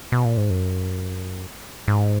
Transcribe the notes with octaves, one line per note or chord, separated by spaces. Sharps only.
B2
A#2
G#2
F#2
G#2